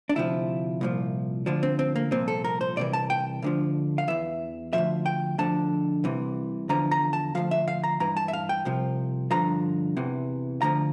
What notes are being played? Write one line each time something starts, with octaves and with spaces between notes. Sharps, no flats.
D4
D2 C3 F3 E4
C2 A#2 F3
D2 D3 F3 D4
C4
C4
A#3
C2 A#2 F3 C4
A4
A#4
C5
C2 C3 E3 D5
A5
G5
D2 D3 F3
F5
E2 E3 E5
D2 C3 F3 E5
G5
D2 D3 F3 A5
C2 C3 E3
E2 D3 F3 A#5
A#5
A5
D2 C3 F3 F5
E5
F5
A#5
G2 E3 A#5
A5
E5
F5
G5
C2 C3 F3
G2 D3 F3 A#5
E2 C3 E3
D2 D3 F3 A#5